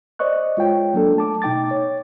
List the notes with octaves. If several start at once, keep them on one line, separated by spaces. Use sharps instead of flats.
C5 D5 D#5 C#6 F#6
G#3 F4 C#5 G5
F#3 A#3 D4 A4
A3 A5 D6
B2 D#4 G5 D6 A6
C#5